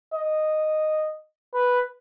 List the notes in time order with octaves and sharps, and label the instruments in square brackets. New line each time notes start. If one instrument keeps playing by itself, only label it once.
[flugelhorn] D#5
B4